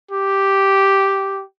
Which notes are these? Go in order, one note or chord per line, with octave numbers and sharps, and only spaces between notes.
G4